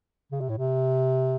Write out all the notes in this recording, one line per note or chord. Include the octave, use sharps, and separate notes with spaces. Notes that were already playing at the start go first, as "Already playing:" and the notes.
C#3
C3
A2
C3